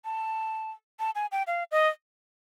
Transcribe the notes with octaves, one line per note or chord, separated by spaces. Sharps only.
A5
A5
G#5
G5
F5
D#5